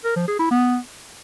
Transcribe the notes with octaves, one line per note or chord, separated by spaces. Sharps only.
A#4
F3
G#4
E4
B3